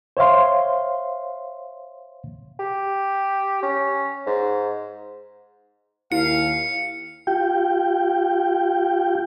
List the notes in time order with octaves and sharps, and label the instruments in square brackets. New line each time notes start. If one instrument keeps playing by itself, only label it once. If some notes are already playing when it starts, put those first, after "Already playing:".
[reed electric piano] C5 C#5 E5 F5 C6
[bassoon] G4
C#4
G#2
[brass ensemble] D#2 F5 [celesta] E4 [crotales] C#7
[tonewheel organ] F4 G4 G5